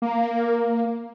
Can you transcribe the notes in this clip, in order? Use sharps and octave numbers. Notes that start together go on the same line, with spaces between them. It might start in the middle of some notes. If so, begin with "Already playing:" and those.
A#3